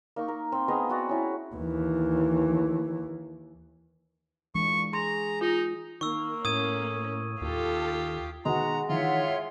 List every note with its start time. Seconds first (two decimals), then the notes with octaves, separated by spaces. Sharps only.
0.16 A#3 D#4 C#6
0.28 A#4
0.52 C4
0.68 B3 G#4 D#5 F5
0.89 C4 F#4 D5 A#5
1.09 C#4 E4
1.55 D#2 E3
4.55 A#2 E3 G#3 D4 C#6
4.93 G#4 A#5 C6
5.41 D#4 F4
6.01 D#3 A#3 C#6 E6
6.45 A2 C#4 D#6 G#6 D#7
7.42 D#2 F4 G4 A4
8.45 B2 D#3 G#3 F#4 B4 A#5
8.89 D#3 E3 F4 C#5 E5 F#5
9.28 C7